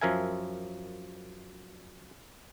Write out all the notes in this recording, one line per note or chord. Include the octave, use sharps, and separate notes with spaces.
F#2 F3 A#4 E5 G#5